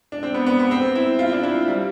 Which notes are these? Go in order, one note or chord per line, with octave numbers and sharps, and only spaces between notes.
D4
C4
B3
B3
B3
C4
E4
F4
D4
E4
G3